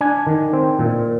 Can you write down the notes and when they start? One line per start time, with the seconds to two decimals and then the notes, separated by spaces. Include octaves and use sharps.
0.01 D4 G#5
0.27 D#3
0.53 C4
0.79 A#2